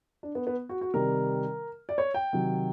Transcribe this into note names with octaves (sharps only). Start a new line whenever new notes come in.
D4
B3
B3
F#4
F#4
C3 D#3 G3 A#4
D5
C#5
G5
C3 D#3 F#3